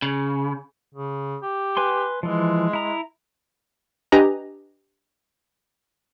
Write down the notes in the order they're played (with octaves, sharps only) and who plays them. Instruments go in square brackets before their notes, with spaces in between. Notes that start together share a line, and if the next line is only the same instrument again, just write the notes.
[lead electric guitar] C#3
[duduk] C#3
G4
[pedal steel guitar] B4 G#5 C6
[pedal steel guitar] E3 F3 [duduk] G#3
[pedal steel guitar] E4 A#5
[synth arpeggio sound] D4 G4 B4 D#5 G#5 A#5